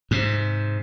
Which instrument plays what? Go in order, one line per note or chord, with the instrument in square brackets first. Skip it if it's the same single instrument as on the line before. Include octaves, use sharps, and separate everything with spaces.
[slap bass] G#2 C3